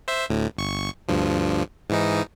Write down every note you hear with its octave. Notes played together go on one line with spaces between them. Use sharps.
C5 E5
D2 A2
G1 C#6
D2 G2 F3
G#2 E3 D#4